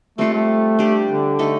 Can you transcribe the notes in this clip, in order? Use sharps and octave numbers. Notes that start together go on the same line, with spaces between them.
G3 A3 C4 F4 A4
A3
G3 D4 G4
D3
A3 D#4 A4